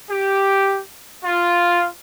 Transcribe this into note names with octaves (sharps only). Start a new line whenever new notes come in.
G4
F4